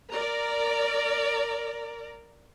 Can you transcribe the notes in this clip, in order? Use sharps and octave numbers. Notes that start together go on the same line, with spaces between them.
A#4 D5 A#5